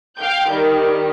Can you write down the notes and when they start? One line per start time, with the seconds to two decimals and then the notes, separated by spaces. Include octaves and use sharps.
0.17 F5 G5 G6
0.49 D#3 G3